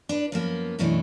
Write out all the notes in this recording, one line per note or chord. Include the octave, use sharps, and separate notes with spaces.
D4 B4
F#2 F3 A#3 B3
F#2 B2 E3 A3 D4